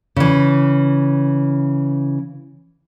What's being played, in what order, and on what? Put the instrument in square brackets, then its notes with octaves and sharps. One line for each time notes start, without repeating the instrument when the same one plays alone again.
[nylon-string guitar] C#3 E3